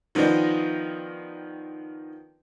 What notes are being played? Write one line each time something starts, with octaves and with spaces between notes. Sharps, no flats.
D#3 F3 B3 C4 D4 D#5